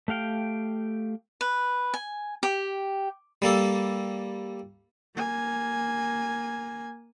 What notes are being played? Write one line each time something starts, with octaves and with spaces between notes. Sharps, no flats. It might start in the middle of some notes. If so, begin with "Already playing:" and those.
A3 G4 F5 G5
B4
G#5
G4
G3 A#3 A4
A#3 G#5